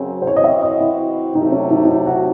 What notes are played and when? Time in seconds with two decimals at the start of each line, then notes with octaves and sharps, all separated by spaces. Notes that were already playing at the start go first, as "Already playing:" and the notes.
Already playing: F#2 C#3 F#3 C4
0.22 C5
0.26 E3 C4 F#4 C#5
0.36 D#5
0.44 E5
0.63 D#5
0.81 E4
1.35 C3 F#3 A3 D#4
1.52 C#4
1.71 D#4
1.85 D#4
1.88 E4
2.06 F#4